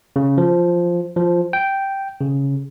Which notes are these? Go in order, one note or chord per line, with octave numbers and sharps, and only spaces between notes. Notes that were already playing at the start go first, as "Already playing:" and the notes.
C#3
F3
F3
G5
C#3